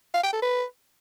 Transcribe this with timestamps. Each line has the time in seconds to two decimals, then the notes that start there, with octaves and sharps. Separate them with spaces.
0.14 F5
0.23 G5
0.33 A4
0.42 B4